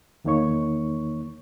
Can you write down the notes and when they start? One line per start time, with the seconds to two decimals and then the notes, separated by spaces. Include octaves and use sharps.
0.24 E2 D#3 A#3 D#4 C#5 C#6